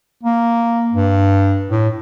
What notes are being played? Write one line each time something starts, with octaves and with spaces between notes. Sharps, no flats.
A#3
G2
A2